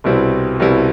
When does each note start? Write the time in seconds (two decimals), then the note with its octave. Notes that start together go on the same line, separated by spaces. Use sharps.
0.04 C2 B2 G3 C4 E4
0.60 C2 B2 G3 C4 E4